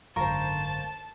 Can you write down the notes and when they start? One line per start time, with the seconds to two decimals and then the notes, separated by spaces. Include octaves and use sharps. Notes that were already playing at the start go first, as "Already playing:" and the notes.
0.16 G#1 F#2 D3 A#4 C5 F5 A5 C#6